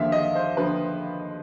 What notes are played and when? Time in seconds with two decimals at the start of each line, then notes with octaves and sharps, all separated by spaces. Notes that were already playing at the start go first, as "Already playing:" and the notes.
Already playing: D#2 D3 F3 E5 F5
0.12 D#5
0.35 C5
0.57 D3 F3 B4